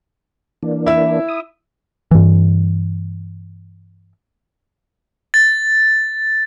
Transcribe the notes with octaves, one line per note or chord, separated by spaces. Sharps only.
E3 A#3 D4
E4 E5
D#6
G2 E3
A6